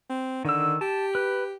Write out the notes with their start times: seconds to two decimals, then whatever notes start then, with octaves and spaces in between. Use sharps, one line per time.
0.10 C4
0.45 D3 D#3 E6
0.81 G4 A5
1.15 B4